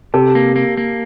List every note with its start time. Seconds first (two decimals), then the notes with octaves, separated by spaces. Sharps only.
0.14 C3 G4 A4
0.35 A#3
0.56 A#3
0.77 A#3